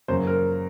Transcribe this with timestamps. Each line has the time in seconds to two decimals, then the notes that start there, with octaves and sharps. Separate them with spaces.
0.08 F#2 C#3 F#3 A#3 C5
0.27 A#4